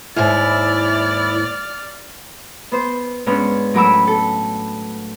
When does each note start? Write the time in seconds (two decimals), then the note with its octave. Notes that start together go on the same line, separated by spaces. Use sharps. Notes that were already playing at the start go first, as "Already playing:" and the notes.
0.16 D#2 G#2 E4 D5 F6
2.72 B3 C5
3.26 G#2 B3 C#4 D4
3.74 A2 F#3 A#4 B5 D6 E6
4.07 A4